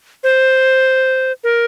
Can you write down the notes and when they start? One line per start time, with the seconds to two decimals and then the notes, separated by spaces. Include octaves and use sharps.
0.23 C5
1.44 A#4